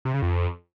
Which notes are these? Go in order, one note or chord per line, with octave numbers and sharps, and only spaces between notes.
C3
C#3
F2